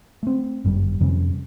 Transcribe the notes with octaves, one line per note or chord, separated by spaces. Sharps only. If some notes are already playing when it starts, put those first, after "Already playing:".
A3 C4
G1 F#2 G3
F2 C3 G3 C#4